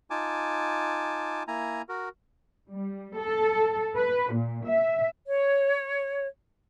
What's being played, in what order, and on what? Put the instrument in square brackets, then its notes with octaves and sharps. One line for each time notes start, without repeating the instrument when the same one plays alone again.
[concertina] D#4 F4 G#5 A5 D6
A#3 E4 G#5 A#5
F#4 A#4
[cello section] G3
A4
B4
A#2
E5
[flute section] C#5